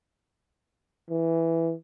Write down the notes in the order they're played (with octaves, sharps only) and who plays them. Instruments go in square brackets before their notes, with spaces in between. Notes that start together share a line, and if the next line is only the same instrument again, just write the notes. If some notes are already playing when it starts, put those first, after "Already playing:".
[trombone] E3